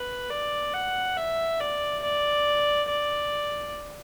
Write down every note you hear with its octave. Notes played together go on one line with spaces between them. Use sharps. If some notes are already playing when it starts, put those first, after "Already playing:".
Already playing: B4
D5
F#5
E5
D5
D5
D5